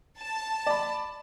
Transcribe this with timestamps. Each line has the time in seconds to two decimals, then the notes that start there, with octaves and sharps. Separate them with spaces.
0.19 A5
0.67 D5 B5